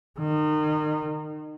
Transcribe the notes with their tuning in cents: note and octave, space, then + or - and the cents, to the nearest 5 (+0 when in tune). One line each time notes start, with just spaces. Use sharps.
D#3 -30